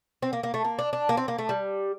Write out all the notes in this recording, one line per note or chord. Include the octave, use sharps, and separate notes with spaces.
C4
A#3
A#3
A3
A#3
D4
D4
A#3
C4
A#3
A3
G3